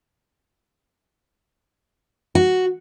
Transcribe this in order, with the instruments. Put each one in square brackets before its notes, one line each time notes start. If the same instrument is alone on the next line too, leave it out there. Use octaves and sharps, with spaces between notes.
[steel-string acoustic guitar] F#4